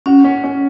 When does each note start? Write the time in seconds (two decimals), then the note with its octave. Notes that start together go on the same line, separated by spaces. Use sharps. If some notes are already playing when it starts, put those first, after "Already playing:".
0.06 C#4 F#4
0.24 C#4
0.44 C#4